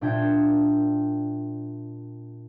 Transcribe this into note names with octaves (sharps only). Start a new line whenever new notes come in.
A#2 D4 E5 G5 G#6